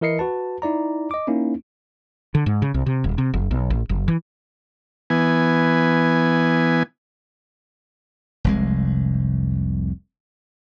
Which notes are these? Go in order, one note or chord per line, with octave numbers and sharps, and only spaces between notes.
E3 E4 A#4 D#5 C7 C#7
F#4 B4 A5
D#4 E4 D5 A#5
D#5 D6
A#3 C#4 D#4 E4
D3
G#2
C#3
C2
C3
D#1
C3
F#1
B1
A1
F#1
E3
E3 B3 G#5
F1 C2 G#3